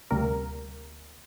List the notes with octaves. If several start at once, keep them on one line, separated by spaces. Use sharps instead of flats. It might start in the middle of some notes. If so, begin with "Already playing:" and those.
D2 C3 G3 A#3 A#4